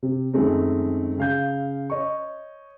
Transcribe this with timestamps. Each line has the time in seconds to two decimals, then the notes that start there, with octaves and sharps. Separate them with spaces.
0.02 C3
0.33 F#2 D#3 G#3 A3 C4
1.18 C#3 F5 G6
1.90 C#5 D#5 C#6